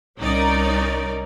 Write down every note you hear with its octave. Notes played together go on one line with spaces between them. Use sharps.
C2 C#4 D#4 A#4 D5